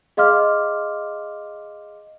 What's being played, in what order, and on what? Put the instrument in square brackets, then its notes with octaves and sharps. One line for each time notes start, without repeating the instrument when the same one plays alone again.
[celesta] G#4 D#5 F5 C6 D6 F6